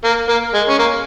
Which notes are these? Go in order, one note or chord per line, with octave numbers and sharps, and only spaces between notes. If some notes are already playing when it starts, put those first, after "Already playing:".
A#3
A#3
G#3
C#4
A#3